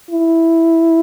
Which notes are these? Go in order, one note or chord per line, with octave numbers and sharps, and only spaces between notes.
E4